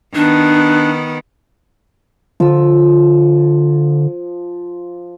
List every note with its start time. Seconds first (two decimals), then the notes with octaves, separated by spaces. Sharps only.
0.15 D#3 B3 D4
2.40 D3 F3 E6